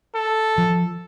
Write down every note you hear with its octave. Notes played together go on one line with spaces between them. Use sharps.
A4
F3